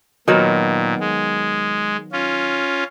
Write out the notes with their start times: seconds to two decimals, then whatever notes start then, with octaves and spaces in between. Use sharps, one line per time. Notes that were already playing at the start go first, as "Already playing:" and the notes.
0.28 A#2 D#3 F#3 B3
1.00 G#3
2.12 C#4 F4